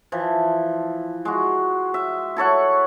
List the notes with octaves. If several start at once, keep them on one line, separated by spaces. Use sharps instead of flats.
E3 F3
G#3 F#4
E5
E4 A4 C#5 F#5